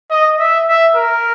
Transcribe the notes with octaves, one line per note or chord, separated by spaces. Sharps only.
D#5
E5
E5
A#4